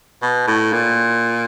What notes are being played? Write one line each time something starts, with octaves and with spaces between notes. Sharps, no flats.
B2
A2
A#2